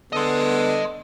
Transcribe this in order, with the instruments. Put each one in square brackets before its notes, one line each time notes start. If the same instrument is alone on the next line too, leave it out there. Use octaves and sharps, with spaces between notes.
[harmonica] D3 A4 [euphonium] B3 [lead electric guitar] D#5 C6